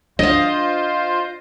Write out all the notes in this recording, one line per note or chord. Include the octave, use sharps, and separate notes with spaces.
D4 F4 C5 D#5 F5